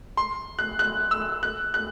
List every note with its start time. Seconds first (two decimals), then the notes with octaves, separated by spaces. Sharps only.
0.17 C6
0.59 F#6
0.79 F#6
1.11 E6
1.43 F#6
1.74 F#6